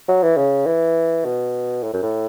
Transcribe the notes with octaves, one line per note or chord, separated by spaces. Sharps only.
F#3
E3
C#3
E3
B2
A2
F#2
A2